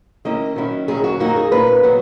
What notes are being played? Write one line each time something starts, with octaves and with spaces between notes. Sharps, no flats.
D#3 A#3 C#4 E4 D#5
D#3 F#3 C#4 E4
D#2 D#3 F#3 C#4 G#4
F#4
F#2 D#3 A#3 D#4 F#4
G#4
A#2 A#3 C#4 B4
D#3 F#3 B3